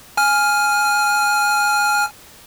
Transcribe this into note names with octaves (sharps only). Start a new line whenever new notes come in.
G#5 F6